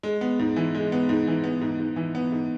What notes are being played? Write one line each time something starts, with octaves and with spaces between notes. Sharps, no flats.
G#3
B3
G#2
E3
G#3
B3
G#2
E3
B3
G#2
G#2
E3
B3
G#2